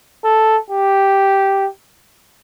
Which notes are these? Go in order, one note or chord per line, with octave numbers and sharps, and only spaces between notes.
A4
G4